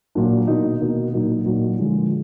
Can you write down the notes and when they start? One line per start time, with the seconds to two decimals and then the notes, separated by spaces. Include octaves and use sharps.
0.15 A#2 F#3 A#3 D4
0.47 B2 A#3 D#4
0.80 B2 A#3 D#4
1.13 A#2 F#3 A#3 D#4
1.46 A#2 F#3 A#3 D#4
1.79 D3 F3 G#3 D4